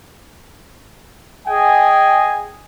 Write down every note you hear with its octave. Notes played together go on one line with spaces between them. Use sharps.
G#4 D#5 G5 G#5